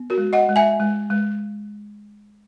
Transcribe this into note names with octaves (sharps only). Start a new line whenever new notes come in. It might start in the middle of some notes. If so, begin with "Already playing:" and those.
Already playing: B3
F#4 A#4
G#3
D#5 F#5
G#3
E5 G#5
G#3
G#3